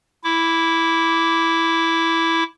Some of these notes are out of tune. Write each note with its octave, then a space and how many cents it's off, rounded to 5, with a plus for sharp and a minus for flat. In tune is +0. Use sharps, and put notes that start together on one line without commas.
E4 +0 D6 -15